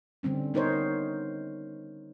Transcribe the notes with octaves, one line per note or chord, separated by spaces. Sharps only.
D3 G3 C4 C#4
B3 D#4 A#4 C5 C#5